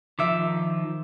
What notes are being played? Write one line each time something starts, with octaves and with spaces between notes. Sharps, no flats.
D#3 F3 E5 D6